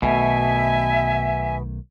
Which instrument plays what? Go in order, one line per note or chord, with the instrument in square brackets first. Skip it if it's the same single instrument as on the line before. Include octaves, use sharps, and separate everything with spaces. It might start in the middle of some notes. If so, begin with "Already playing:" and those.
[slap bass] B1 D#3 A3 [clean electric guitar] B2 [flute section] E5 [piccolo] G#5